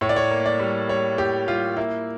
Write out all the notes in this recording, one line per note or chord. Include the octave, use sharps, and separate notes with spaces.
A2 C#5
D5
C#5
A#3
D5
G3
G3 C#5
A2 G4
G3 F4
A#3 E4